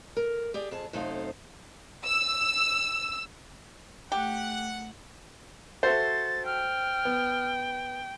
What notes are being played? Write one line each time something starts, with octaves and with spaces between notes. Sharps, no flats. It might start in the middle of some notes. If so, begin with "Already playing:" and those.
A#4
G4 G#4 D5
F2 G#4 A5
F#2 C3 A3 D#4 C5 F5
E6
A3 G4 F#5
F#4 A4 C5 E5 A6
G5 F6
B3